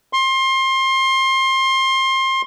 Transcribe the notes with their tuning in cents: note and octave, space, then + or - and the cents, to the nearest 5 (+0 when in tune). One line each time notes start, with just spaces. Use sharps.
C6 +25